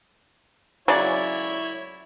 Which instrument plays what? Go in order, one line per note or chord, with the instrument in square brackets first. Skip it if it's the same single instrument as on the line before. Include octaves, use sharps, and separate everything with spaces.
[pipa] C#3 D5 [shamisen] F#3 [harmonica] E4 C#5